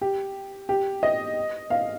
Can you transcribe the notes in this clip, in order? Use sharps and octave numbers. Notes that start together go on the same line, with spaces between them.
G4
G4
D#5
F5